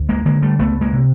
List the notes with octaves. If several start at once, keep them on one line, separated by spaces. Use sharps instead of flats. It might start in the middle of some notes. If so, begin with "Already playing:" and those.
Already playing: D2
G#3 A#3
D3 G#3 A#3
G3 A3
C#2 A3 B3
G#3 A#3
C3